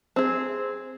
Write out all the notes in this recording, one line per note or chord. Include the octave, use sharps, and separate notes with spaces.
C4 G#4